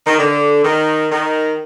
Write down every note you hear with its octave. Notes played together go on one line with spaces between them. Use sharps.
D#3
D3
D#3
D#3